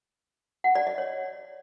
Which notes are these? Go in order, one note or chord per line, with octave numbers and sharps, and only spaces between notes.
F#5
D5
D#5
C#5